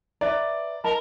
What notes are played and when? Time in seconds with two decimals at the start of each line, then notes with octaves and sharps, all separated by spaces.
0.21 B4 D5 E5 A#5
0.84 A#4 D#5 A5 B5